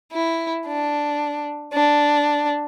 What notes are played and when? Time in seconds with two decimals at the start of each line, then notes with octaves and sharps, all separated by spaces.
0.12 E4
0.66 D4
1.73 D4